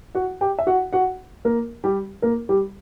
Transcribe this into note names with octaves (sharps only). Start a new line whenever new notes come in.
F#4 F#5
G4 G5
E5
F#4 F#5
F#4 F#5
A#3 A#4
G3 G4
A#3 A#4
G3 G4